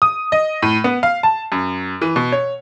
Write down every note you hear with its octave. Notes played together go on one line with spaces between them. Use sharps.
D#6
D#5
A2
B3
F5
A5
F#2
E3
B2
C#5